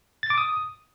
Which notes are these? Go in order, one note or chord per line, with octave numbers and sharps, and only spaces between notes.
A6
D6
D#6